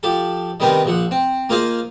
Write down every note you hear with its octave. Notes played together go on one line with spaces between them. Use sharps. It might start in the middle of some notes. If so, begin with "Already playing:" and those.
F3 G4 A4
D#3 G3 B3 C4 A#4
A#1 F3 F#5
C4
A#3 F4 G#4 C5 D#5 F5